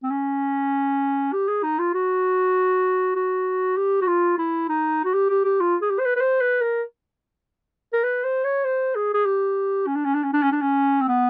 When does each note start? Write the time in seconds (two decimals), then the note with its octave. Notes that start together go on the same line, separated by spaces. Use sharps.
0.03 C4
0.11 C#4
1.33 G4
1.48 G#4
1.63 D#4
1.79 F4
1.94 F#4
3.16 F#4
3.77 G4
4.01 F#4
4.07 F4
4.38 E4
4.69 D#4
5.05 F#4
5.14 G4
5.30 G4
5.45 G4
5.60 F4
5.82 G#4
5.90 G4
5.99 C5
6.05 B4
6.16 B4
6.20 C5
6.41 B4
6.62 A#4
7.93 A#4
8.04 B4
8.24 C5
8.44 C#5
8.64 C5
8.95 G#4
9.14 G#4
9.25 G4
9.87 C#4
9.96 D4
10.05 C#4
10.14 D4
10.24 C#4
10.33 D4
10.42 C#4
10.52 D4
10.61 C#4
11.01 C4
11.08 B3